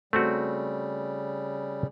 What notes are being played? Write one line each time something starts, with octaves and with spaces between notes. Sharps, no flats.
C#3 G3 A3 C4 F#4